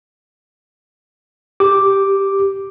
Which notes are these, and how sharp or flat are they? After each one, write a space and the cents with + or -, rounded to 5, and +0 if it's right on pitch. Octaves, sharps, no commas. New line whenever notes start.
G4 +0 D6 +0